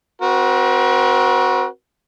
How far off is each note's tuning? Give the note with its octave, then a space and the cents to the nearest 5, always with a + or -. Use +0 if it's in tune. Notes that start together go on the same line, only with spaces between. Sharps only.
C4 +0 F#4 +0 A#4 +45